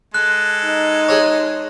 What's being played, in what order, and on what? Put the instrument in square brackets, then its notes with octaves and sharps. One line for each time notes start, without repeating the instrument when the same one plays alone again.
[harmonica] G#3 A4 [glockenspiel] F#6
[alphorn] D#4
[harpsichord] G#4 C#5